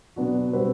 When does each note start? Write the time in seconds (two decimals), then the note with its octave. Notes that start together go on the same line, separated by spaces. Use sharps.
0.16 B2 F#3 B3 D4 F#4
0.53 B2 G3 C4 F#4 B4